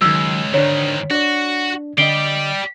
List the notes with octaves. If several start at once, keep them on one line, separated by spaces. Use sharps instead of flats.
C#2 D#3 F#3 E6
G#2 D3 D#3 D4 C#5
D4 F#4 D5
D3 G4 D5 D#5 C7 D7 G7